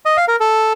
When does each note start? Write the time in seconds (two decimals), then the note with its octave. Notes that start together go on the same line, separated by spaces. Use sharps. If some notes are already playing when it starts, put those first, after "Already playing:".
0.05 D#5
0.17 F5
0.28 A#4
0.40 A4